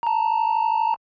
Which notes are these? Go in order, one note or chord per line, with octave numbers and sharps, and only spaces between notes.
A5 A#5